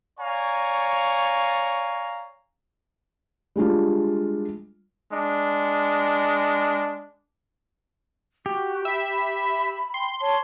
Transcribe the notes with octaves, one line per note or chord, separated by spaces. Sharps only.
C#5 D5 F5 G#5 A#5 C#6
G3 G#3 D4 F4
G#3 D4
F#4 G4
E5 B5
G5 C6
C#5 A5 C6